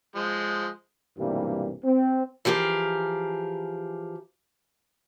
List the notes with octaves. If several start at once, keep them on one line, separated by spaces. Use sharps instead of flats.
F3 G#3
B1 G2 C3 E3 G3 A#3
C4
E3 F3 G4 G#4 A#4